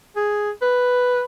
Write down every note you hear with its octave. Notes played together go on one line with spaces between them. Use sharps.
G#4
B4